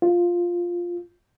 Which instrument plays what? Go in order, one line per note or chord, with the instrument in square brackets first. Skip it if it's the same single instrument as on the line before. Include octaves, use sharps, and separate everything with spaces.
[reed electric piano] F4